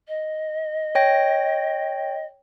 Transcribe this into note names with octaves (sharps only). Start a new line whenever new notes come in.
D#5
C#5 G5 A#6